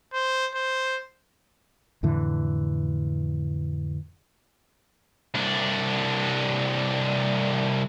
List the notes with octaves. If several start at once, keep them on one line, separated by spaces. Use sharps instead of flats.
C5
C5
F2 A2 D3 E3
C2 D4